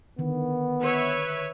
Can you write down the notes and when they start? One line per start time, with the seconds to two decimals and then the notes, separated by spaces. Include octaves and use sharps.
0.18 D3 D#3 B3
0.81 B4 C#5 E5